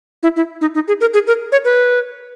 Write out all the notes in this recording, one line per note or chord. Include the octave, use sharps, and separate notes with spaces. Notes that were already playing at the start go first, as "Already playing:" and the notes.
E4
E4
D#4
D#4
G#4
A#4
G#4
A#4
C#5
B4